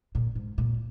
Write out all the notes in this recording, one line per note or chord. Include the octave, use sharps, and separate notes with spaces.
A#2
G#2
A#2